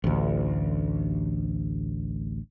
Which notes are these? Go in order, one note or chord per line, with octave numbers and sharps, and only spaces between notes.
A1 D2